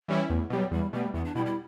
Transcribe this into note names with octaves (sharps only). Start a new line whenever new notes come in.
E3 G3 C#4 E4
E2 A3
B2 F#3 G3
E2 G3
B2 G3 A3
E2 B3
D4
B2 G3 E4
E4